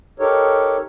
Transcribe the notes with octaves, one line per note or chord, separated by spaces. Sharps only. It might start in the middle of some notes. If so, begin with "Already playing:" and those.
D#4 G4 A4 A#4 C#5